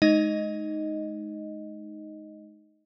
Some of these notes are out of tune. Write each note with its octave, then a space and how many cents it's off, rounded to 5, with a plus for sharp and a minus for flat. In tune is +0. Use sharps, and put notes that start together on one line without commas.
G#3 +35 D#4 +0 D#5 +0